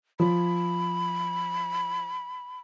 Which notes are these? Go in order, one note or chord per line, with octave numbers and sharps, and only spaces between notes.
F3 B5